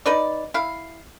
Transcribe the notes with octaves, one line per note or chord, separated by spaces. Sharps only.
D#4 B4 D5
E4 F5